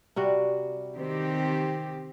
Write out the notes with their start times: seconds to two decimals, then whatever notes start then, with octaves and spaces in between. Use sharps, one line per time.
0.16 C3 G3 F#4
0.93 D#3 C4 G4